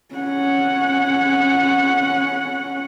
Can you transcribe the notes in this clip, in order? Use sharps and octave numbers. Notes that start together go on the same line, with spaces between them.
C#4 F#5